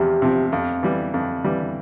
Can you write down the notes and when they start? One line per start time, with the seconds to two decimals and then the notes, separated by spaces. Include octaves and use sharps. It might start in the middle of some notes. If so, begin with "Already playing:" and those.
Already playing: E2 C3 F3 G4
0.22 C3 F3
0.52 F2
0.83 E3 G3
1.14 F2
1.44 E3 G3